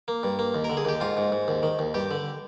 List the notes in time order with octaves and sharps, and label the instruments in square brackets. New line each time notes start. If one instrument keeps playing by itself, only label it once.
[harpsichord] A#3
G2
A#3
D#2
A#4
D3
G#4
D#2 G4
G#2 F4
G#2
G#2
D#2
D#3
D#2
G2 G4
D3